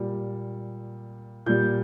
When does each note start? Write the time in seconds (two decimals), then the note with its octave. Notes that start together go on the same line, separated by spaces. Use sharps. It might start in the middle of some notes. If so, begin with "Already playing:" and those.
Already playing: A#2 G3
1.46 A#2 G3 G6